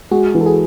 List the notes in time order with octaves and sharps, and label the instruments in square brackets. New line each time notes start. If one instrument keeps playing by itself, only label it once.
[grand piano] G#3 [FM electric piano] F#4
[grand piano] E3
[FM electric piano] A4
G#4